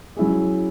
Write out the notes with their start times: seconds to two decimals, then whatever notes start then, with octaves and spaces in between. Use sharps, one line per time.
0.17 F#3 C#4 E4 G#4